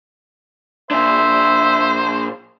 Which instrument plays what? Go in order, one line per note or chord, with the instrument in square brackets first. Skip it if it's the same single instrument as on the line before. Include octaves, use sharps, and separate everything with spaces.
[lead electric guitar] A#2 D4 [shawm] C5 [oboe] E5